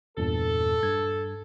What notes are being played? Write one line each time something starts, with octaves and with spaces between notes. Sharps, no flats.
E2 G2 A#2 A4
G2 G#6